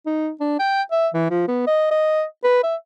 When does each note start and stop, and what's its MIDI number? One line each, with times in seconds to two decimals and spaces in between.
0.06 0.30 63
0.40 0.55 62
0.59 0.82 79
0.91 1.08 76
1.14 1.30 52
1.30 1.45 53
1.48 1.66 59
1.67 1.88 75
1.91 2.24 75
2.44 2.63 71
2.64 2.76 76